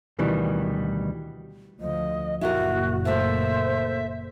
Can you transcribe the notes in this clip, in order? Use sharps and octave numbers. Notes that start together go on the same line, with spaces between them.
D2 B2 D#3 E3 G3
D2 F3 D#5
F#1 A#2 E4 F#4 G4 A#4
A3 A#3 C5 E5